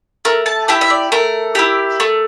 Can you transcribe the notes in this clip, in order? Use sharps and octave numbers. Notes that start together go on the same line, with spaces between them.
A3 A#4
A5
E4 G4 G5
E5
D5
A3 A#4
E4 G4
A3